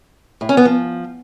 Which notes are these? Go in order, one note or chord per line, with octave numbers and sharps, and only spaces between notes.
A2
C#4
B3
F3